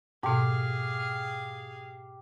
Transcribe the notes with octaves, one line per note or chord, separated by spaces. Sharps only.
G#2 B2 G4 G#4 F5